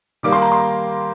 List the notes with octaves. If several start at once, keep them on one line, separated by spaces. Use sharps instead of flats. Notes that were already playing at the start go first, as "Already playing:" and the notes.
D#3 G3 A#3 D6
C6
A#5
C6